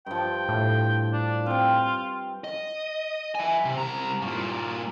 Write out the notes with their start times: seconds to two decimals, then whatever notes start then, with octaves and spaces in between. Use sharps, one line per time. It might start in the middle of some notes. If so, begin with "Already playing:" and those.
0.06 G2 F3 G5
0.49 A2
1.13 D4
1.46 C4 F4 G5
2.44 D#5
3.35 E5 G#5
3.65 C3
3.78 C2 A#5
4.21 G2 A#2